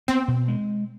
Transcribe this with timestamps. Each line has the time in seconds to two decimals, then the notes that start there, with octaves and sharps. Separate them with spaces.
0.08 B3 C4
0.28 B2
0.48 G#3